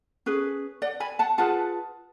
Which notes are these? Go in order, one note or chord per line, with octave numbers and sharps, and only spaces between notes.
C#4 G#4 B4
D5 F#5
G#5 B5
F#5 A5
F4 G#4 B4 F#5 A5